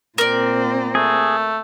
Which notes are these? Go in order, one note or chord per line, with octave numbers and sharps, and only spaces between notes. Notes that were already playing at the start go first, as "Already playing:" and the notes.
A#2 C4 A#4 D5
A3 G#4